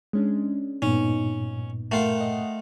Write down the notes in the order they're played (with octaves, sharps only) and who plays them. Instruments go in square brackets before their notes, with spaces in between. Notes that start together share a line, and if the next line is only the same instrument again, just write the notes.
[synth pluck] G#3 C#4 D4
[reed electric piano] G2 A#2 [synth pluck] B3 D#4 [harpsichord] C#4
[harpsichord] A3 F4 [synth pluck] A#4 F#5 G5
[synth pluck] D#5 F#5